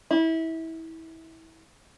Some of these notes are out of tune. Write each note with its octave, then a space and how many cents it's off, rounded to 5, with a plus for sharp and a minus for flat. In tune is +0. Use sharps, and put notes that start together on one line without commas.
E4 -25